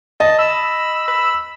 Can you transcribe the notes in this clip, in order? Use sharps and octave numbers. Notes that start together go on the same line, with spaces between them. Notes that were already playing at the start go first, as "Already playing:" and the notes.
D#5 A5
B5 E6
B5